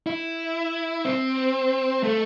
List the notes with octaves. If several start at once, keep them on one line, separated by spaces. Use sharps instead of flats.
E4
C4
A3